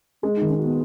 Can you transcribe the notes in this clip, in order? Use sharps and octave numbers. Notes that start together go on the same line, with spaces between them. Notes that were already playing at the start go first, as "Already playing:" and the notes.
G#3 C#4
D#4
D#3
C#4
B3 F#4